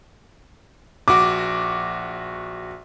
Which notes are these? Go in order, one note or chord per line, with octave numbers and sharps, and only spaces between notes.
A#1 F#4 D6